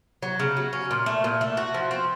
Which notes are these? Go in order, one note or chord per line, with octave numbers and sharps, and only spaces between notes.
F#3
C#3
F#3
C#4
A#2
A3
A#2
A3
F#4
F3
C4